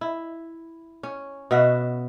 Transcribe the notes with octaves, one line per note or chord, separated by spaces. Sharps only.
E4
C#4
B2 B3 F#4 E5